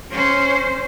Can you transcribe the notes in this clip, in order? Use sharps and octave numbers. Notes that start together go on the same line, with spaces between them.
C#4 C5